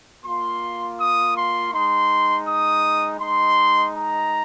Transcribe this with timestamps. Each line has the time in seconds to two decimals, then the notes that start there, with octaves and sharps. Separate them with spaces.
0.24 A#3 F4 C6
0.99 D#6
1.36 C6
1.72 G#3 D#4 C6
2.46 D#6
3.20 G#3 D#4 C6
3.93 A#5